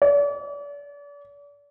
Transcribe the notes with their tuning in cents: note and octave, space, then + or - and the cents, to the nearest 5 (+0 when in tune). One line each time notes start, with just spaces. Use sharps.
D5 -40